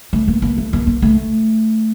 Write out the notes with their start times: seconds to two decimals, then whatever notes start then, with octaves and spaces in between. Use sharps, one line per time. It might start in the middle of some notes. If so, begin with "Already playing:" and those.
0.13 A3
0.28 A#3
0.42 A#3
0.57 A3
0.73 A#3
0.87 A#3
1.02 A3